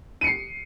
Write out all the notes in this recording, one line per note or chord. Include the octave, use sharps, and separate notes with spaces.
C7 C#7 D#7